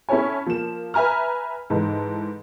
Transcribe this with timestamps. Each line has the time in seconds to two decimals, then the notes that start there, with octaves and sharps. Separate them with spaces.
0.09 C#4 E4 A4 C#5 G#5
0.46 F3 A#3 E7
0.94 B4 E5 G#5 A#5 F6
1.70 G#2 E3 D#4 A4